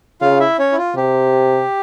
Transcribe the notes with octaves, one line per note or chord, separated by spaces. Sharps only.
C#3 F4 F5
E4 E5
C#4 C#5
E4
F4
C3 G4